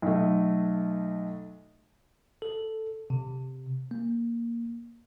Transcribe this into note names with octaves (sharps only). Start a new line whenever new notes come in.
B1 A3
A4
C3
A#3